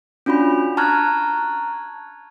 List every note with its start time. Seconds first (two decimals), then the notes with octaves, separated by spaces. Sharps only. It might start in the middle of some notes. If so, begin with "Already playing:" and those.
0.26 C#4 D4 F4 F#4 B5
0.77 A5 A#5 C#6 F6 F#6 G#6